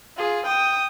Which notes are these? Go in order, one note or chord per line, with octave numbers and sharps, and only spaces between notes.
F4 G#4
G5 D#6